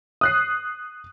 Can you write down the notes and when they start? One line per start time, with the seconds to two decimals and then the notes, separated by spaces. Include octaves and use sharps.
0.21 D#6 F#6 C7